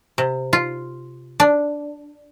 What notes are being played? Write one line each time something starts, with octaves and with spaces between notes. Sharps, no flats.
C3
F4
D4